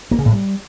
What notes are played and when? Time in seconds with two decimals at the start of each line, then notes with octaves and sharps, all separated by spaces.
0.11 A#3
0.19 C#3
0.26 A2
0.33 G3